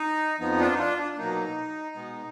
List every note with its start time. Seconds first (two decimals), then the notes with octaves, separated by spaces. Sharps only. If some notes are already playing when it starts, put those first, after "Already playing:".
Already playing: D#4
0.40 F2 F3 B3 D#4
0.59 D4 F4
0.73 D#4
0.78 D4 F4
0.98 D4
1.12 D4
1.18 B2 F#3 A#3 D#4
1.95 B2 G#3 B3